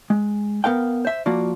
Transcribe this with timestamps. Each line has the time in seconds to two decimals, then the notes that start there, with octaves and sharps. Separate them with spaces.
0.10 G#3
0.64 B3 A#4 F5 G5
1.05 C5 E5
1.26 F3 A#3 F4 F#4 D5